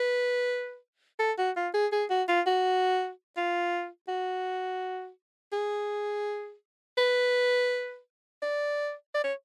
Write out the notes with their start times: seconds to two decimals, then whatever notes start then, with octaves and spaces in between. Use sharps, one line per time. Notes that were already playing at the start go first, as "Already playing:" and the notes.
Already playing: B4
1.19 A4
1.38 F#4
1.57 F4
1.74 G#4
1.92 G#4
2.10 F#4
2.28 F4
2.46 F#4
3.37 F4
4.08 F#4
5.53 G#4
6.98 B4
8.42 D5
9.15 D5
9.24 C#5